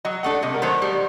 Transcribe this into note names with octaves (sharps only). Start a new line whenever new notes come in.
F#3 D#5
A3 D4 A4 F#5
C3 D#5
A#4
D#3 F#3 A3 C5
G3